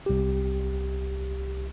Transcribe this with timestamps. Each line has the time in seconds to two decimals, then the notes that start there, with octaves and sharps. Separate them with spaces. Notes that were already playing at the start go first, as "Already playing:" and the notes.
0.06 C2 G4